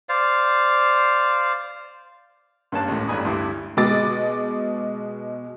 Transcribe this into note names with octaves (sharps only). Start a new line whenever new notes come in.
C5 D5 F5
G2 A#3 C#4 A5 F#6
C#2 A2
A1 G2 D4 G#5 B5 D#6
D2 G2 E4 D6
B2 G#3 D#5 D6 A6